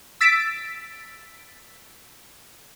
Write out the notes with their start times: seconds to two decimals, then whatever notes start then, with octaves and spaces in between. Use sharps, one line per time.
0.21 E6 A6 B6 D7